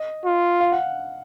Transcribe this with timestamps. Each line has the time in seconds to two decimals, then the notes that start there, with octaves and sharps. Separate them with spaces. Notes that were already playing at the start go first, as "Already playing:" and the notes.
Already playing: D#5
0.25 F4
0.60 F5
0.72 F#5